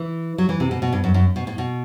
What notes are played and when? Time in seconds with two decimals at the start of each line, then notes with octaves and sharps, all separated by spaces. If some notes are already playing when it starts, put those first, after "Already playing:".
Already playing: E3
0.38 F#3
0.49 E3
0.60 C3
0.71 B2
0.82 B2
0.93 G2
1.04 F#2
1.14 F#2
1.36 B2
1.47 A2
1.58 B2